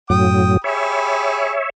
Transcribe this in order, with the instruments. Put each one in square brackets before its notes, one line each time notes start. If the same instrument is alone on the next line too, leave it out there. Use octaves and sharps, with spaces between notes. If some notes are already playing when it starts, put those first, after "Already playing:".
[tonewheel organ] F#2 A2 F#3 [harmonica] G5 D#6
[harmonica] G4 G#4 B5 [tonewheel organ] C#5 E5